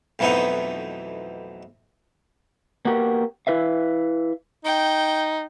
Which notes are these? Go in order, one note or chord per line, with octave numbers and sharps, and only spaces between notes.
B1 F2 E3 A3 B3 D#4
A#3 B3 F#4 G4 A#4
E4 B4 E5 F5
D#4 G5